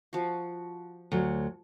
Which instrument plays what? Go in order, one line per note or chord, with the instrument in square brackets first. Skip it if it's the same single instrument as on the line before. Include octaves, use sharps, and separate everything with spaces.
[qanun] F3 F#4
[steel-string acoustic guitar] D2 F#3